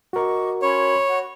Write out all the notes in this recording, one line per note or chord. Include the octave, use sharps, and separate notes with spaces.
F#4 A#4 D#5 C#6 D6
C#4 C#5 B5 C6
F#4 F#5